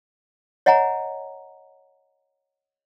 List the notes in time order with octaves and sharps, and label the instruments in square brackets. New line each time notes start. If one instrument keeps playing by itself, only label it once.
[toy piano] C#5 D#5 F#5 G#5 A#5